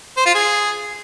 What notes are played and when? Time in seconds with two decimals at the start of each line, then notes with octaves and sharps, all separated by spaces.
0.17 C5
0.26 F4
0.35 G#4